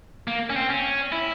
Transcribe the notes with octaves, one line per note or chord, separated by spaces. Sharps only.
A#3
C#4
C4
C#4
E4